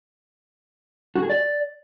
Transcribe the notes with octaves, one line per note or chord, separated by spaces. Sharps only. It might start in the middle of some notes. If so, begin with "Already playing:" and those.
F#4
G#4
D5